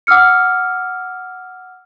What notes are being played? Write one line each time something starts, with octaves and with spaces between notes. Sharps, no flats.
F#5 D6 E6 F6 C#7